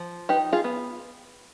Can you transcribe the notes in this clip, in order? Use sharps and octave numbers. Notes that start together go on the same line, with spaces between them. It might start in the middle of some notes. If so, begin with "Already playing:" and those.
Already playing: F3
D#4 G4 B4
F4 G#4
B3